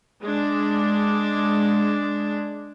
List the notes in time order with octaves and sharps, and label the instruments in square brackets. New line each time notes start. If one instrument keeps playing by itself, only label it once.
[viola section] G#3 D4